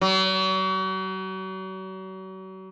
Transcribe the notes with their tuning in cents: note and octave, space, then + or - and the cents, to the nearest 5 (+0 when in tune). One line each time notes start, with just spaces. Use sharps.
F#3 +40